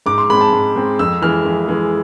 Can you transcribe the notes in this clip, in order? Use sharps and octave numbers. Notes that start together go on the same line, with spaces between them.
G#2 D6
C6
G#3 C4 B5
A5
G#2
G#3 C4
F2 E6
E3 G#3 F6
F2
E3 G#3